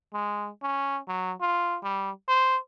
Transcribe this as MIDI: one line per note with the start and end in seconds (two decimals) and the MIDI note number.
0.14 0.49 56
0.63 0.98 61
1.08 1.32 54
1.41 1.77 65
1.83 2.11 55
2.28 2.57 72